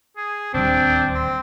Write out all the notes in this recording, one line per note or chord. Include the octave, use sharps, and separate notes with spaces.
G#4
D1 D#2 G3 C4 D4
C4